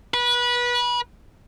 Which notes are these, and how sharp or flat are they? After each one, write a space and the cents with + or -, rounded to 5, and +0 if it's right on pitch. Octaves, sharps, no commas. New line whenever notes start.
B4 -25